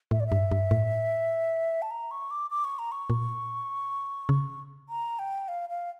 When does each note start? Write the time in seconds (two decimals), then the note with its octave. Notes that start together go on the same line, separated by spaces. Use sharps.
0.11 A2 E5
0.20 D5
0.27 G2 E5
0.51 G2
0.71 A2
1.82 A5
1.91 A#5
2.11 C#6
2.31 D6
2.50 D6
2.64 C#6
2.79 A#5
2.92 C#6
3.10 A#2
4.29 C#3
4.89 A#5
5.19 G5
5.48 F5
5.69 F5